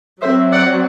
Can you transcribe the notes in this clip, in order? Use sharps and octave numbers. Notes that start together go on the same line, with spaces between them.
F#3 C5 E5
C4
D5 F#5